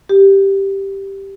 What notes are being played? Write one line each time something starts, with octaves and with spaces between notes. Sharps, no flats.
G4